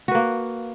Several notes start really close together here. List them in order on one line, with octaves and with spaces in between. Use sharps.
F#4 B4 A#3